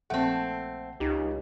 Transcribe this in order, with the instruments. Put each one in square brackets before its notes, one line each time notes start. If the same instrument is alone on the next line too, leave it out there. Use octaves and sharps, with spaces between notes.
[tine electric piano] A#1 F#5 [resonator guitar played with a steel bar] A3 C4
[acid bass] C#2 [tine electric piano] D#4 G4